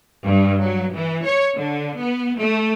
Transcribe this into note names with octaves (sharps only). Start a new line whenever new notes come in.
G2
F#3
E3
C#5
D3
B3
A3